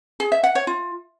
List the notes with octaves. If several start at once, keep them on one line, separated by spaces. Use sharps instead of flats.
G#4
E5
F#5
C#5
F4